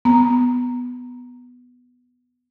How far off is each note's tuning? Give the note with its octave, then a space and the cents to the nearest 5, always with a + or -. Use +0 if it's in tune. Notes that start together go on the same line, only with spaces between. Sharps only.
B3 +0 A#5 +0